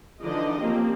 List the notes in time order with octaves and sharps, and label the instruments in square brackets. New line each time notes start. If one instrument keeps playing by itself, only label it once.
[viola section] D3 E3 F3 D#4 D5 D#5
F3 A#3 C4 C#4 G4